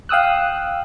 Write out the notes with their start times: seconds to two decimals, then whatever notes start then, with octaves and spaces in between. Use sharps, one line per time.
0.09 F5 G5 D#6 E6 F#6